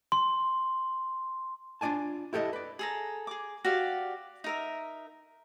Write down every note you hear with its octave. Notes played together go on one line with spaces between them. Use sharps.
C6
D4 F4 D5 G#5 A5
E4 G4 A4 B4 D#5
B4 D5
G#4 A4 A#5
G#4 D6
F#4 G4 D5 F5
D#4 A#4 E5